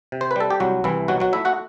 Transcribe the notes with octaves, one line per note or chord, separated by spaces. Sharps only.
C3
C5
B4
G3 A4
G4
C2 F#3 F#4
C2 E3 E4
B2 F#3 F#4
F#3 F#4
A3 E4 E5
F#4 F#5